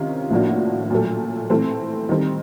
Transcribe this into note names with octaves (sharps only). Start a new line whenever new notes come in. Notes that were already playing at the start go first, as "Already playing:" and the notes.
Already playing: C3 D#3 C#4 F4
A2 F3 A#3 D4 F#4
A#2 F#3 A3
E3 A3 C4 E4
D#3 G3 C4